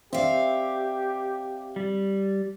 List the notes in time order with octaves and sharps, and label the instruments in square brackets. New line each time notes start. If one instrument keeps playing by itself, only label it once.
[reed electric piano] C4 D5 [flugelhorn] G4 [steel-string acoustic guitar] E5 F5
[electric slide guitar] G3